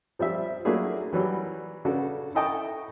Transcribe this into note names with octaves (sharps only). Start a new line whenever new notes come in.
F3 G3 C4 E5
F#3 A3 A#3 D4 E4 G#4
E3 F#3 G3
C#3 D4 F#4 A4 B4
E4 A4 D#5 G5 A5 C#6